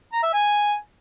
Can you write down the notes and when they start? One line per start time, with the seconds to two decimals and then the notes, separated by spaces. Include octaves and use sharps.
0.13 A#5
0.23 E5
0.33 G#5